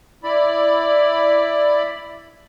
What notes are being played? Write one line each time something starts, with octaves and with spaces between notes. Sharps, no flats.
E4 D5 B5